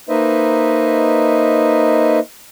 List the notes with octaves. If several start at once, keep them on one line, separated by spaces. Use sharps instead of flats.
A#3 D#4 B4 C5 D#5 E5